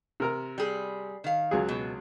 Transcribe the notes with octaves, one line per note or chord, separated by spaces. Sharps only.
C3 A#4 A#5
G3 G#4
D#3 F5
C#2 F#3 G#4
B2